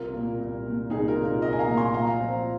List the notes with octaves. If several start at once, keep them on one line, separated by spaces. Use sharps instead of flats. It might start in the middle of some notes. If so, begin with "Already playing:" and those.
Already playing: C2 F4 A#4
A#2 A#3
C2
A#2 A#3
C2 D#4 G#4
F4 A#4
A#2 A#3
F4 A#4
C2 A#4 D#5
G#5
F5 A#5
A#2 A#3
G#5 C6
A#2 F5 A#5
F3 C4